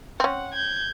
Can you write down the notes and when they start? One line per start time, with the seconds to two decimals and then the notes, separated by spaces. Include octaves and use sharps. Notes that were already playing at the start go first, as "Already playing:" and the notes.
0.20 C4 C#4 F#5
0.53 G6 G#6